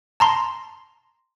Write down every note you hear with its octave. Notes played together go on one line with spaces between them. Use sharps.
A5 A#5 C6